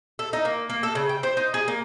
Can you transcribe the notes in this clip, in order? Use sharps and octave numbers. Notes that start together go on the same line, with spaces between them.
A4
D#4
A#3
A#3
A4
C#3
G5
C5
D#4
G#4
A#3